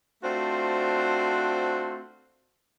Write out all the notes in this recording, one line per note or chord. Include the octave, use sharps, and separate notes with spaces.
A3 C4 D4 F4 F#4 C5